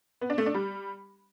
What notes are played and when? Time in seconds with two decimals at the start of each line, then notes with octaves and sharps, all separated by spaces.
0.21 B3
0.30 D4
0.38 A3
0.46 D4
0.54 G3